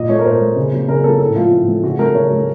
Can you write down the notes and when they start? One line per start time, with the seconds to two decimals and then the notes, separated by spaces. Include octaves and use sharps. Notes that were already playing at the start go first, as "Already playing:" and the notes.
Already playing: A#2 D#5
0.09 A3 C#5
0.19 A#4
0.25 A#2 C5
0.41 A3
0.56 C#3
0.73 F#3 A#3
0.88 C#3 A#4
1.04 F#3 A#3 A4
1.20 A2 A4
1.36 F3 A3 F4
1.52 A2
1.68 F3 A3
1.83 C#3 F#4
1.99 F#3 A3 A#4
2.15 C#3 C#5
2.31 F#3 A3